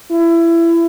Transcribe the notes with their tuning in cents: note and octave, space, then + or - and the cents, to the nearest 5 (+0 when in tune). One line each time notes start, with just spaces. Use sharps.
E4 +25